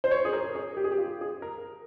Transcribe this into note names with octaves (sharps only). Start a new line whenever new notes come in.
C5
C#5
G#4
A#4
G#4
G4
G#4
G4
F4
G#4
A#4